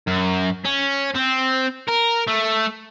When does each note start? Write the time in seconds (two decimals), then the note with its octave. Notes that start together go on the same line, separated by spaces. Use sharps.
0.07 F#2
0.65 C#4
1.16 C4
1.88 A#4
2.28 A3